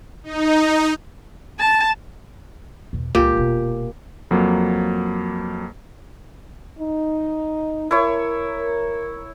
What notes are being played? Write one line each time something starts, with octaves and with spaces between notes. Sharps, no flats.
D#4
A5
E2 B2
C#2 A#2 G#3 G4
E1 B2
F2 F#3 A#3
D#4
E4 A#4 C#5